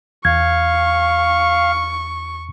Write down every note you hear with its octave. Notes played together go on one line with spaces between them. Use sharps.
E2 F5 C#6 G#6